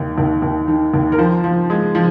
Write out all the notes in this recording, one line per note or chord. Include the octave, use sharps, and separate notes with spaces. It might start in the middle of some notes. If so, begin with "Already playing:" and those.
Already playing: D#2 D#3
D#2
D#2
D#3
D#2
A#4
F3 C5
F3
G#3
F3